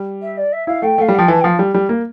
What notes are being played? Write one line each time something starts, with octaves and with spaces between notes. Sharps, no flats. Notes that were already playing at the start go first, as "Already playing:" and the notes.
Already playing: G3
E5
D5
E5
E4 F5
A3 G5
A3 F5
G3
F3 G5
E3 A5
G5
F3 F5
G3
G3
A#3